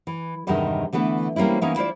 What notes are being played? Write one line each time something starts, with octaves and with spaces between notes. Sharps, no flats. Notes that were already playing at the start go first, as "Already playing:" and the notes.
E3
E2 G2 C3 D#3 G#3 D#4
D3 E3 A3 B3
G3 A#3 C4 C#4 E4
E3 A#3 B3 C#4 D#4
E4 F4 C5 D5